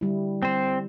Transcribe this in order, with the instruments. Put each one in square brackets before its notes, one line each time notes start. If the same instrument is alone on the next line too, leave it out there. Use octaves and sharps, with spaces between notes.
[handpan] D3 G3 E4
[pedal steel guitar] C4 C5